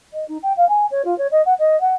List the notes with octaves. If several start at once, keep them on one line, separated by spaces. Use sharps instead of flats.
D#5
D#4
G5
F5
G#5
C#5
F4
C#5
D#5
F#5
D#5
F#5